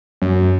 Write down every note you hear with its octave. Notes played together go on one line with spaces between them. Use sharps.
F#2